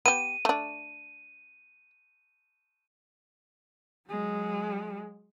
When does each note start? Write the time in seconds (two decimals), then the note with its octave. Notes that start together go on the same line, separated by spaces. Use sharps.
0.06 B3 G4 D#7
0.45 A3 D4
4.09 F#3 G#3